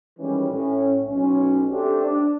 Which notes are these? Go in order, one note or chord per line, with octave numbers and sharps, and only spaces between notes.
D#3 E3 G3 G#3 C#4
A2 C#4
B1 C#4
A3 C4 D4 G4
D4